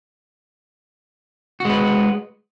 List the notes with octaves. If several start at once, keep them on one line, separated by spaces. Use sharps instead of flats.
G#3 F#4 B4